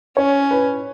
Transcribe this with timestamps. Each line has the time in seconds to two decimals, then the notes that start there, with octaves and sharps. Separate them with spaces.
0.17 C#4 C#5
0.51 B4